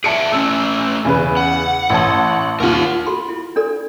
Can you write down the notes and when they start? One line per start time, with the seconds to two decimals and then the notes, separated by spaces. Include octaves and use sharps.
0.04 G#4 D5 E5 A5 C#7 D7
0.32 A3 C#4 E6
1.05 E2 C#3 B4
1.37 F#5
1.90 A1 A5
2.60 D#2 F4 A#4 F#5
3.06 F4 F#4 C6
3.29 E4
3.56 D4 A4 D5